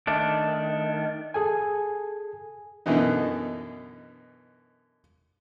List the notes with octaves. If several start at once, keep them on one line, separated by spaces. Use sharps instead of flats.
D#3 A3 D4
G#4 A4 G#5
F#2 B2 D3 E3 B3 D#4